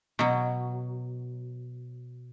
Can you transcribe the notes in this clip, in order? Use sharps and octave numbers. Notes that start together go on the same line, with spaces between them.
B2 F#3